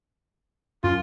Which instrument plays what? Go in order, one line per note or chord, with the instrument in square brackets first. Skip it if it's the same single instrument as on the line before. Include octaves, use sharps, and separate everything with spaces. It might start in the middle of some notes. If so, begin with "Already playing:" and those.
[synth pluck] F#2 [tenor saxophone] F4